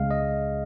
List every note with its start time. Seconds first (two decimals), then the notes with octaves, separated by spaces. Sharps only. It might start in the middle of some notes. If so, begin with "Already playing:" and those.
Already playing: C#2 C#3 G#3 F5
0.11 D#5